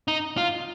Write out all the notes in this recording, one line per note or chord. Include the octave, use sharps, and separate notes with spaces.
D#4
F4